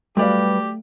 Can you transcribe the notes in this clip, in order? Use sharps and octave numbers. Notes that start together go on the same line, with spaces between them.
F#3 G3 A3 G4 B4 D5 F5